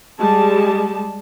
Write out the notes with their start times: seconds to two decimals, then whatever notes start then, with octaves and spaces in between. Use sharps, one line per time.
0.19 G3 G#3 A5